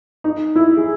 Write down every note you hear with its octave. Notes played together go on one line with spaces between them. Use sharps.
D#4
E4
G#4